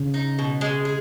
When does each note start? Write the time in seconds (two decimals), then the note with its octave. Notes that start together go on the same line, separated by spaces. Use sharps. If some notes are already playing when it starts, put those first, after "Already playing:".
Already playing: C#3
0.14 D#4
0.39 B2
0.61 G#3
0.85 G#4